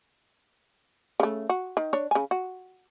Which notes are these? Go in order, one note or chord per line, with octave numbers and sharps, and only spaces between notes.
C#3 A3
F#4
D#3
D4 C#5
C#3 G#5
F#4